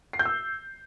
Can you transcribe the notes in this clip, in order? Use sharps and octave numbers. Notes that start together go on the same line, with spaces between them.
C7
G6
E6